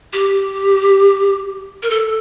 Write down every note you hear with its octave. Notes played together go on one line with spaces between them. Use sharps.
G4
A#4
A4